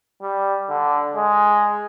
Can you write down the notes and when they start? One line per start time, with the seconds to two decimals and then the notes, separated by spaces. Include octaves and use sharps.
0.22 G3
0.69 D3
1.16 G#3